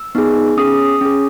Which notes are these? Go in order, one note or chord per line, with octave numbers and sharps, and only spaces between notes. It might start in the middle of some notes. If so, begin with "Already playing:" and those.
Already playing: E6
B3 D#4 G#4
C#4 G#4 D#6
C#4 G#4